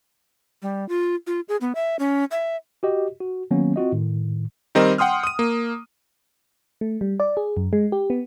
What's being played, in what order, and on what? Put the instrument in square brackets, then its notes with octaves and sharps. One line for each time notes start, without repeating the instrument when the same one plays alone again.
[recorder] G3
F4
F4
G#4
B3
E5
C#4
E5
[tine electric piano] F#4 G4 D#5
F#4
D#3 F#3 A#3 B3 C#4
C4 F4 F#4 D#5
A2 D#3
[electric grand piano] D#3 G3 C4 A#4 D#5
F#5 G5 C6 D#6 F6
D#6 D#7
A#3
[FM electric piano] A3
G3
D5
G#4
F#2
G#3
G4
B3